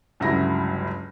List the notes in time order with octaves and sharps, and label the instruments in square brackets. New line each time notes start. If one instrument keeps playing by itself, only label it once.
[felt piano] G1 C#2 F#3 E4 A#6